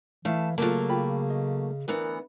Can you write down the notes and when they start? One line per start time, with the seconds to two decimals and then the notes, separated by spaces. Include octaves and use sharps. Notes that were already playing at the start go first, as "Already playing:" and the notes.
0.25 E3 A3 E4 F5 A5
0.58 C#3 F#3 A3 A#3 F4 A5
0.89 F4 G4 B5
1.30 D#5
1.88 D2 E3 B3 A#4